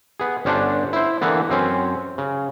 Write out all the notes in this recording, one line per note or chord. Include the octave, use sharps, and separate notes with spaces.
B3 G#4
G1 C#4 D4 C5 F#5 A5
E4 C5
D3 E3 A#3 B3
F#2 C4 C#4
C#3